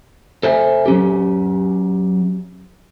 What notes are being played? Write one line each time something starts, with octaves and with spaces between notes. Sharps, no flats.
A4 C5 E5 G#5
F#3 C#4 G4